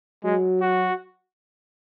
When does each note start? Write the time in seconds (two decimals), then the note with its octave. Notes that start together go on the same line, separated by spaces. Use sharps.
0.24 F#3 G#3
0.61 F#4